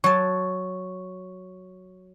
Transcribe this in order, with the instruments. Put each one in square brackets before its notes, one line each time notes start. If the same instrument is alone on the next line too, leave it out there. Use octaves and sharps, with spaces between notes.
[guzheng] F#3 A5 [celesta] C#6